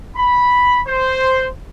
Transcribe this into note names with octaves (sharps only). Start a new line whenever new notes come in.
B5
C5